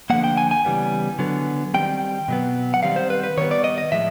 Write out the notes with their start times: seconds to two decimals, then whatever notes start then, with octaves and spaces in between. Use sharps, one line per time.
0.10 D3 F3 A#3 F#5
0.24 G5
0.37 G#5
0.51 G#5
0.65 C#3 E3 G3 B3
1.19 D3 F#3 B3
1.74 D#3 G3 C4 G5
2.28 B2 F#3 B3
2.74 F#5
2.83 D#3 G3 C4 F5
2.96 C5
3.10 B4
3.23 B4
3.37 D#3 G3 B3 C#5
3.51 D5
3.64 D#5
3.78 D#5
3.91 A2 F3 G#3 E5